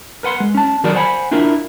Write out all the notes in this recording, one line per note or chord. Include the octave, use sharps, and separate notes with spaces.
A#4 B4 F#5 C6
G#3
C#4 A5
D#3 F#3 F#4 G#4 A#4 D5
C5 F#5 G#5 A#5 B5
D4 E4 F4 A#4